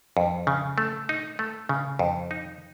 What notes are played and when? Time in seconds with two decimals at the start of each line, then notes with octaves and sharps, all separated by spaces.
0.17 F2
0.47 C#3
0.78 A3
1.09 D#4
1.39 A3
1.69 C#3
1.99 F2
2.31 D#4